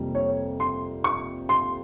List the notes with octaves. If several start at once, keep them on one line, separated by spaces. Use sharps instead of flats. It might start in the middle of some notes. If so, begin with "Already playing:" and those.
Already playing: F2 C3 G3 A#3
C#5
C6
C#6
C6